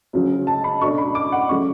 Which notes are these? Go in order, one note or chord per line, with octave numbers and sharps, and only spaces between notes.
D2 C#3 F#3
A5
B5
B2 A3 D4 C#6
B5
D6
F#5
C#3 F#3 A3 C#6